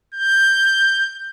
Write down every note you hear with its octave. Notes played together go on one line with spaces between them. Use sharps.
G6